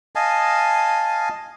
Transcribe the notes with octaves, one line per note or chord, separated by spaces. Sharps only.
D#5 F5 G#5 A5